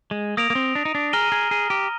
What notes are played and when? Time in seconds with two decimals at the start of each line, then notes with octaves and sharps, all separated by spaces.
0.11 G#3
0.37 A#3 D#6 A#6 D7 F7
0.50 A#3
0.55 C4
0.75 D4
0.85 D#4
0.95 D4
1.13 G#4 A#5 F6 A#6 D#7 G7
1.32 G#4
1.51 G#4
1.70 G4